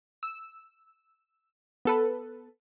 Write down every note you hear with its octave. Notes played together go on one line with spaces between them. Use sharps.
E6
B3 A4 B4